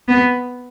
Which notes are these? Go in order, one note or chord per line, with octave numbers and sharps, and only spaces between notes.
B3